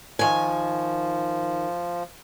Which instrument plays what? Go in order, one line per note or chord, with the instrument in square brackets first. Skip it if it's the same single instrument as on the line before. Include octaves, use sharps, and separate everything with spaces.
[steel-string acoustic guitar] D#3 G#5 [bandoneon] F3